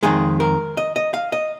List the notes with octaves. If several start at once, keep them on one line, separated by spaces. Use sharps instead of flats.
F2 D#3 G#3 G#4
A#4
D#5
D#5
F5
D#5